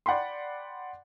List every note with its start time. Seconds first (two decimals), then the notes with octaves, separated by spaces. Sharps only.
0.06 D5 F#5 G5 B5 C6